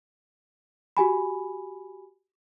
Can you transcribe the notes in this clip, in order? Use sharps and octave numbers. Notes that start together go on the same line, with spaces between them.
F#4 G4 G#5 B5